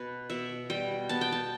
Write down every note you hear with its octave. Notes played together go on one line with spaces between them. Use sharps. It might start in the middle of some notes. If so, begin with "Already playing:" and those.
Already playing: B2 B4
B2 E5
G3 G5
B3 A5
G5
A5